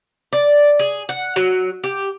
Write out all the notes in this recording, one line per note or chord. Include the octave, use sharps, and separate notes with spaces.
D5
G#4
F#5
F#3
G4